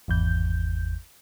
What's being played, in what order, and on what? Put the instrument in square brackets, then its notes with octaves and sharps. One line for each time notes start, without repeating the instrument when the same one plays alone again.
[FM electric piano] G#1 E2 G6